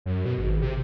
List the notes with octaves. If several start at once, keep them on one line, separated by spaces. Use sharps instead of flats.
F#2
B2
G#1
C3